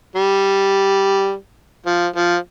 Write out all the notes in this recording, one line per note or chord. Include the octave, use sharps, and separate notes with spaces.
G3
F3
F3